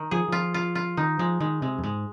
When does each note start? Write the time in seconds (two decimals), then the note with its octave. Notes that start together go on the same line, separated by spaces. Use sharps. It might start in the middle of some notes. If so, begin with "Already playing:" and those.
Already playing: D#3
0.11 F3 G#4
0.28 F3 F4
0.54 F4
0.75 F4
0.97 D#3 D#4
1.19 F3 G#3
1.40 D#3 G#3
1.62 C3 G#3
1.78 F2
1.83 G#2 G#3